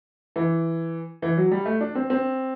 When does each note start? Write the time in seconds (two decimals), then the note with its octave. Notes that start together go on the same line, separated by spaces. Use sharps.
0.36 E3
1.22 E3
1.37 F#3
1.51 G3
1.66 A3
1.81 D4
1.95 C4
2.10 C4